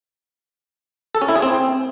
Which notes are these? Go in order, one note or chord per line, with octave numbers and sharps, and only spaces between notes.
A4
C#4
E4
G#4
C4